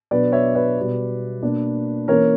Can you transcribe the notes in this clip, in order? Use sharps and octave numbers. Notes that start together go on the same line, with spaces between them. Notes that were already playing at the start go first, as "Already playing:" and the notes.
B2 F#3 B3 D4 B4 D5
C#5 E5
B4 D5
B2 G3 B3
B2 A#3 D4
E3 A#3 C#4 A#4 C#5